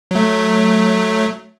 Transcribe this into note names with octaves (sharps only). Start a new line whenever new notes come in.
F#3 A3